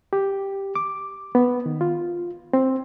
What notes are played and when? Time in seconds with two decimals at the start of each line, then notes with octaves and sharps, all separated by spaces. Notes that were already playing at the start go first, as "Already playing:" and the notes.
0.13 G4
0.75 D6
1.35 B3
1.66 D#3
1.81 F4
2.53 C4